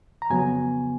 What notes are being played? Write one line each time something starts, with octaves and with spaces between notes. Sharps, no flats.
A#5
F2 C#3 F#3 B3 G#5